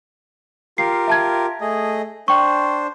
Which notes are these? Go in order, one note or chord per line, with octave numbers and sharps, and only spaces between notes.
F4 G4 A#4 C7
E5 A5 G#6
A3 G#4 D#5
D4 C5 G5 C#6